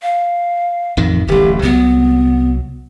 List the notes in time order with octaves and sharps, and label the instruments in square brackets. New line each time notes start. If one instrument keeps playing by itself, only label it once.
[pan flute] F5
[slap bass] A1 F2 D#3
[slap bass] D1 A1 [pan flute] G4
[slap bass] C2 F#3 [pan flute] B3